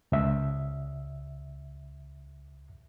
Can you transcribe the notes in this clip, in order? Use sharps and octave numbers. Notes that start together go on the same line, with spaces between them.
C#2 E5